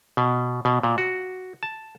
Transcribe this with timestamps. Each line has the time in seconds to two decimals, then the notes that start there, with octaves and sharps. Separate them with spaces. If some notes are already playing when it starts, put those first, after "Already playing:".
0.17 B2
0.65 B2
0.83 A#2
0.98 F#4
1.63 A5